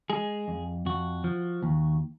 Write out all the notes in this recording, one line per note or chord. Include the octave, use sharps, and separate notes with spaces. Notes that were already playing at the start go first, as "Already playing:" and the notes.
G#3 G#4
F2
F2 F#4
F3
D#2